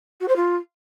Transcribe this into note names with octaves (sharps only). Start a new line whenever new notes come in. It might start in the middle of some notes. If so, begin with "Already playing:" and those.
F#4
C5
F4